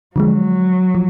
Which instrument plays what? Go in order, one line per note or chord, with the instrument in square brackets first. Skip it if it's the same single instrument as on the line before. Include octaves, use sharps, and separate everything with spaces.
[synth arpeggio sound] D3 F3 G#3 [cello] F#3
[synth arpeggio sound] F3